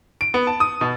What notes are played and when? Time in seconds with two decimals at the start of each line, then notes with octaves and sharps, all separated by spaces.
0.21 D7
0.34 B3
0.47 A5
0.60 D#6
0.81 B2